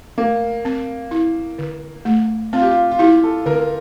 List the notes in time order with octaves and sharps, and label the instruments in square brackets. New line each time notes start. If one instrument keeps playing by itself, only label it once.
[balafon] A3 [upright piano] A#3
[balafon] C4
E4
D3
A3
[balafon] C4 [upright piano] F4
[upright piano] G4
F4
F4
[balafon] E4 [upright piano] G4
[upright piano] A4
[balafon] D3 [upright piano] A#4